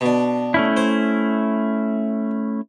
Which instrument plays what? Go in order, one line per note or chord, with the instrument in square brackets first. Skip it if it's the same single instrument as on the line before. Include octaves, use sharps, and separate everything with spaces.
[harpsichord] B2 D4
[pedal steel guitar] A3 C#4 E4
[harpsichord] C5